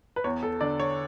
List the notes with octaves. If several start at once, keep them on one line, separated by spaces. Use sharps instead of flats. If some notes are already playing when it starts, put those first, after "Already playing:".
B4
E2 C#5
A4
D3 D5
C#5